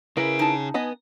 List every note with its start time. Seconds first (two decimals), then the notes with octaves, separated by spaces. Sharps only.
0.17 C#3 E4 G#4 A#4 B4 D7
0.39 D#4 A5
0.74 B3 B4 D#5 G#5